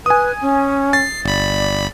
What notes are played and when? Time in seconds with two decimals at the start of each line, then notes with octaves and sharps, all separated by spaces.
0.06 B4 G#5 D#6
0.42 C#4
0.93 A6 C7
1.25 G1 D5 B5